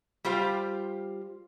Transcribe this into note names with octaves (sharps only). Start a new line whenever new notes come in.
G3 F4 G4 C5 F5